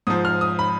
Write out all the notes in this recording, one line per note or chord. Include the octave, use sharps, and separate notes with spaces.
G#2 F3 D#6
F6
D#6
B5